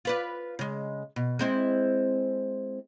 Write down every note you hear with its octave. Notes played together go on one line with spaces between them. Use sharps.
F4 B4 D5
C#3 G#3
B2
G#3 C4 E4